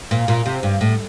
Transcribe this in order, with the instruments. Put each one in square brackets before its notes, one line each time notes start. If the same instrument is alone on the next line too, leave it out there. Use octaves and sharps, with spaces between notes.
[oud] A#2
A#2
C3
G2
A2